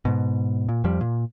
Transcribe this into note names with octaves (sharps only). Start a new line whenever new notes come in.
G#2 B2
A#2
F2 F3 G3
A#2